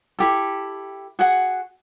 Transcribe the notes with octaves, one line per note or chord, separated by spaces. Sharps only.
E4 G4 A4
F#4 G#4 F#5